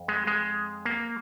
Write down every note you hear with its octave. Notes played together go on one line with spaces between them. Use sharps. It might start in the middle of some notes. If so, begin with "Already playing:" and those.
Already playing: F2
G#3
G#3
A#3